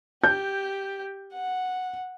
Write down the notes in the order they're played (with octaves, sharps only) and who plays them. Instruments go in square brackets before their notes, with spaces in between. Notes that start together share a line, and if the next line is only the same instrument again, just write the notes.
[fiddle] G4 [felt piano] G6
[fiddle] F#5